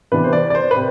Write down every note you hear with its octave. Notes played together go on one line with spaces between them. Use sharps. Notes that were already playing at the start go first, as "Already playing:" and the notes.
C3 E3 B3 D4 B4
C5
D5
D5
C5
B4
C3